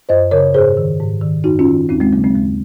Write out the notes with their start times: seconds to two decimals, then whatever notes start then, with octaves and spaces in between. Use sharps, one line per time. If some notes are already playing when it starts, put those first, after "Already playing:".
0.09 F#2 C5 D#5
0.31 C#3 A#4 C#5
0.54 G#2 G#4 C5
0.77 D#3
1.00 G#2
1.21 D#3
1.44 F#2 D#4 F#4
1.59 C#4 F4
1.68 D#3
1.89 D#2 C4 D#4
2.00 G#3 C4
2.13 C#3 F#3 A#3
2.24 G#3 C4
2.35 D#2 G#3 C4